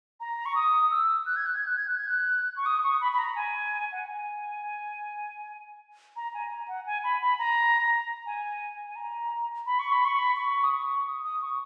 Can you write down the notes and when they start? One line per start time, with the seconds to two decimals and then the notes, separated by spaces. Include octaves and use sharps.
0.20 A#5
0.46 C#6
0.55 D#6
0.91 E6
1.26 F#6
1.36 G#6
1.46 F#6
1.57 G#6
1.67 F#6
1.77 G#6
1.87 F#6
1.97 G#6
2.08 F#6
2.56 C#6
2.66 D#6
2.83 C#6
3.01 B5
3.12 B5
3.18 A#5
3.36 G#5
3.92 F#5
4.06 G#5
6.16 A#5
6.34 G#5
6.51 A#5
6.68 F#5
6.86 G#5
7.04 B5
7.21 B5
7.39 A#5
8.26 G#5
8.87 G#5
8.96 A#5
9.66 B5
9.79 C#6
9.92 B5
10.05 C#6
10.18 B5
10.36 C#6
10.64 D#6
10.72 C#6
11.07 D#6
11.24 D#6
11.42 C#6